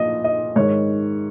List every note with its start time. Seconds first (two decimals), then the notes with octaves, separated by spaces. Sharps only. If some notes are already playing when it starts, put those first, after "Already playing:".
Already playing: A#2 F3 D#5
0.24 D#5
0.56 G#2 D#3 C#5